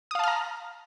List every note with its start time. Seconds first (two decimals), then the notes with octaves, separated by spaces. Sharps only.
0.11 D#6
0.15 F5
0.19 A5
0.24 F6
0.28 A#5